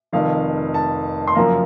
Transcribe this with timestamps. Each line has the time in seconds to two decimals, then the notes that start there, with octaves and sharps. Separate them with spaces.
0.13 F1 F2 D#3 F5
0.74 A5
1.28 C6
1.35 F#1 F#2 F3 A#3 A#5